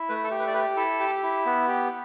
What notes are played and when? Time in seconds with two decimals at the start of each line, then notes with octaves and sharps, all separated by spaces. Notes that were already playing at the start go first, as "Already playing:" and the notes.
Already playing: E4
0.09 A3 B4
0.24 A4
0.31 G4
0.39 B4
0.47 D5
0.54 G4 B4
0.77 E4 A4
1.00 G4
1.23 E4
1.46 B3
1.68 G4